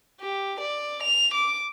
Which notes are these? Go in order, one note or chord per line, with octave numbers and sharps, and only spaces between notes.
G4
D5
F7
D6